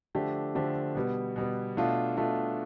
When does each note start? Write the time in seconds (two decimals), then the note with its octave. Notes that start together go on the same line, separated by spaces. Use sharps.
0.15 D3 F3 A3 D4 G4
0.55 D3 F3 A3 D4 G4
0.95 B2 G3 B3
1.36 B2 G3 B3
1.77 B2 A3 D4 F4
2.17 B2 A3 D4 F4